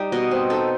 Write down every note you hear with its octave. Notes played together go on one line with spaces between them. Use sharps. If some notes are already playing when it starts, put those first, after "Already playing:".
Already playing: G3 D#4
B2 D#5
C4
D#4 A4